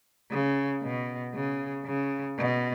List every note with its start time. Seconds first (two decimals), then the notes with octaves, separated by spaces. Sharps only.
0.31 C#3
0.82 B2
1.34 C#3
1.86 C#3
2.38 B2